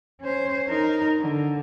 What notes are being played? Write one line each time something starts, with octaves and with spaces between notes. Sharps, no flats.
C#4 C5
D#4 A#4
D3